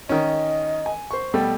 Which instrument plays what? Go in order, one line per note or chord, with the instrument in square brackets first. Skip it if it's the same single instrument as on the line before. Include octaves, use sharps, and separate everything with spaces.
[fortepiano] D#3 C#4 [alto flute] D#5
[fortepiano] G#5
C5 C#6
[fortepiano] B2 G3 A3 [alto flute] G5